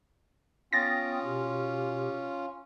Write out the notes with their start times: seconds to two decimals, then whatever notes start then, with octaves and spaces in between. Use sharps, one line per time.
0.73 B3 C#4 F4 G5 D#6 A6 A#6
1.24 B2 G4